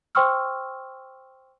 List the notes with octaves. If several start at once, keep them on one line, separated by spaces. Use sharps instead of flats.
C5 G5 C6 C#6 E6 F6